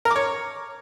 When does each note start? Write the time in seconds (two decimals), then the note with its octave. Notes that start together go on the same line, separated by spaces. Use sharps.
0.05 A#4
0.10 D6
0.16 C#5